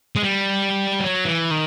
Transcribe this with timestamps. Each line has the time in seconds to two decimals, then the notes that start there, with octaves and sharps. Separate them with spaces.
0.16 G#3
0.23 G3
1.00 F#3
1.25 E3
1.51 D#3